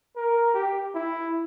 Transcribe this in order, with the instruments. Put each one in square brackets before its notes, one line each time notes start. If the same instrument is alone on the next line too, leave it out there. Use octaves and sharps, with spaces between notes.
[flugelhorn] A#4
G4
E4